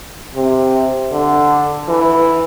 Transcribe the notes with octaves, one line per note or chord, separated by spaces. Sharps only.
C3
D3
E3